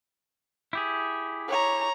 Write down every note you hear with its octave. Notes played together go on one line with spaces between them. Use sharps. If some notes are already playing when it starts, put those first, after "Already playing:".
E4 G4 G#4
C#5 A#5